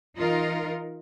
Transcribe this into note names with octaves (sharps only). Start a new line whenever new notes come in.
E3 D#4 F4 A#4